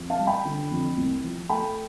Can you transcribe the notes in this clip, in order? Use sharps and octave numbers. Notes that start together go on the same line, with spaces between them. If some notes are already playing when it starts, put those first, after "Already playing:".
Already playing: F2
F5 A5
G3
G5 B5
D3
F2
C2
F3
A3 G5 B5